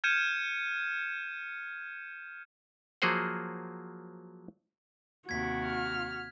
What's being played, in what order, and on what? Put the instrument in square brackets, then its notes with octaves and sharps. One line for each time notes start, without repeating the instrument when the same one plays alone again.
[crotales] F6 G6 G#6 C#7 D#7 E7
[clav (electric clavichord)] F3 F#3 A#3 G#4 C5 F#5
[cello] D#2 C3 [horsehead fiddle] F#4 [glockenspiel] G#6 B6
[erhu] F6